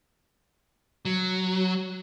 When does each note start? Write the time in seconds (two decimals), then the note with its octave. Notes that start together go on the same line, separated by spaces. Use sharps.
1.05 F#3